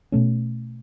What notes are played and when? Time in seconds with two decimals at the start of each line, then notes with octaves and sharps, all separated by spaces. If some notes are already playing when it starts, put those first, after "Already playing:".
0.12 B2 A3 C#4